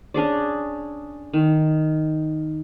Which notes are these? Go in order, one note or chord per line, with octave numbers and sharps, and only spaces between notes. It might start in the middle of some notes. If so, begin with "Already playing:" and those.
C#4 D4 G#4 D5
D#3